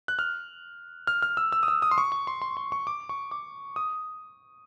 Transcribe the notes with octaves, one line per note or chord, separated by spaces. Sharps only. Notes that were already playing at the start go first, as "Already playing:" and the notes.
F#6
F6
F6
F6
E6
E6
D#6
E6
D#6
C6
C#6
C#6
C6
C6
C6
C#6
D6
C#6
D6
D#6